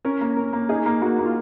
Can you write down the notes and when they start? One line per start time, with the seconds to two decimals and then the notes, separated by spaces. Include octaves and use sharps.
0.05 C#4 A#4
0.21 A#3
0.37 C#4 A#4
0.53 A#3
0.69 D#4 G#4
0.86 A#3
1.02 A#3 F#4
1.19 A#3
1.26 F4